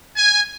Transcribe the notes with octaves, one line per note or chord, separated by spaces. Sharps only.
G#5